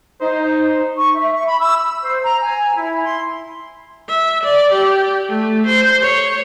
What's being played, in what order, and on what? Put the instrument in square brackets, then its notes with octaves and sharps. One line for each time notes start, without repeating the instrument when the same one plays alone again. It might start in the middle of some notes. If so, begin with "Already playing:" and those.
[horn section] D#4 [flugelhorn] C5
[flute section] C#6
E5
C#6
B5
E6
E6
C5
A#5
G#5
E4
C6
[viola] E5
D5
G4
A3
C5
C#5